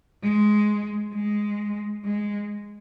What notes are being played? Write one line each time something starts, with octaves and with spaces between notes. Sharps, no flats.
G#3
G#3
G#3